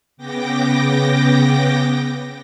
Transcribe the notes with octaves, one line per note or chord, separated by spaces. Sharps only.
C#3 B3 G5 D6 A#6